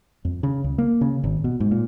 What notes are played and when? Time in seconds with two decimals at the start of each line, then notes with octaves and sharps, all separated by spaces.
0.25 F2
0.43 C#3
0.64 C#2
0.78 A#3
1.01 C#3
1.24 G#1
1.44 B2
1.60 G#2
1.71 A#2